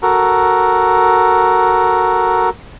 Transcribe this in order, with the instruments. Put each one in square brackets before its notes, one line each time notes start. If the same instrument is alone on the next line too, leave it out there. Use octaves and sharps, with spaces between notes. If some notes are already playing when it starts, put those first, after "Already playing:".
[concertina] F#4 A4 A#4